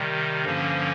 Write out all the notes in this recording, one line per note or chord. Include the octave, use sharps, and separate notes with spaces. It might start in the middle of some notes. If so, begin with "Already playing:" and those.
Already playing: C3 D#3 G3
G2 D3 F3 A#3 C#4